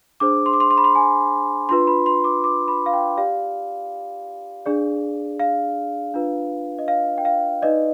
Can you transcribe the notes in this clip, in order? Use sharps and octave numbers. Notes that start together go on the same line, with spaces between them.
D4 G#4 C5 D6
C6
D6
C6
C6
B5
C6
G#5
D4 F4 B4 C6
B5
C6
D6
D6
B5
F5
G5
G4 D5 F5
D4 G#4 D5
F5
D4 F4 B4
D#5
F5
G5
F5
D#4 B4 D5 D#5